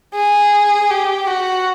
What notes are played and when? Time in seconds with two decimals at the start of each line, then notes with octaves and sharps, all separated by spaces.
0.15 G#4
0.90 G4
1.27 F#4